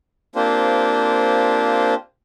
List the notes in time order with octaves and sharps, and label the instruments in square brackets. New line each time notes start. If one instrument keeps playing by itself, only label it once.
[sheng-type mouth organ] A#3 C4 D4 F4 G4 C5